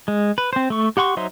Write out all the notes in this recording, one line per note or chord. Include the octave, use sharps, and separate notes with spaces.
G#3
B4
C4 C5
A3 C#6
G4 F#5 C6 C#6
F#3 D#4 C5 E5 C6